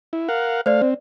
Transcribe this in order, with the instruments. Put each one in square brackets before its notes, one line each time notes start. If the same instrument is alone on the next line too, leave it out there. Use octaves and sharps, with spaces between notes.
[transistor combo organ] E4
A#4 F5 F#5
[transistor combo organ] A3 F5 [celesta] C5 D5
[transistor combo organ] C4